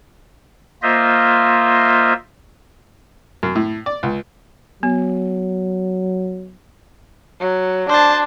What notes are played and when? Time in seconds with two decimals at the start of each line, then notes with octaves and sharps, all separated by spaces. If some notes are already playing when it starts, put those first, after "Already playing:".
0.83 A#3 F4 C5 D#5 E5
3.43 F#2
3.56 A2
3.86 D5
4.03 C#2
4.83 F#3 B3
7.40 F#3
7.90 D4 C5 A5